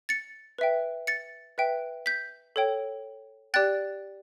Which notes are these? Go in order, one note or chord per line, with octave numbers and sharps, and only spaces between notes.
A6 C#7
B4 E5 G5
A6 C#7
B4 E5 G5
G6 B6
A4 C#5 G5
G4 D5 G5 F#6 A6